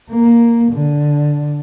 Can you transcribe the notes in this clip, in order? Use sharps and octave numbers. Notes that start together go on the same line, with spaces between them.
A#3
D3